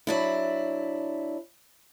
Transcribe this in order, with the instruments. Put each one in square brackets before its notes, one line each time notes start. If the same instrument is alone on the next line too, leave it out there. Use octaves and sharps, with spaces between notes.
[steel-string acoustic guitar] F#3 D4 E4